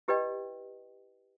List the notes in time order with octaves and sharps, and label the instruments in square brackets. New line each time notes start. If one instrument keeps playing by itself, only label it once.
[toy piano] E4 G4 B4 D5 D#5 G5